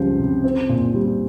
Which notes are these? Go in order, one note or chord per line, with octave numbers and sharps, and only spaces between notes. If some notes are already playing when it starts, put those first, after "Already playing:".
Already playing: C#2 F3 G3 C5
C3
C4
A#2
G3